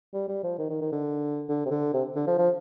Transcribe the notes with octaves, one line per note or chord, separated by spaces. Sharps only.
G3
G3
F3
D#3
D#3
D#3
D3
D3
C3
D3
C3
D3
F3
F3